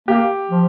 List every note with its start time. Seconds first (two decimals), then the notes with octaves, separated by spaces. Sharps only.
0.08 A#3 G4
0.50 F3